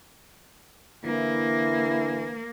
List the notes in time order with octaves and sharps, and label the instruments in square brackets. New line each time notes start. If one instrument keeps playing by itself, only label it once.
[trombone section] D3 E3 E4 [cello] A#3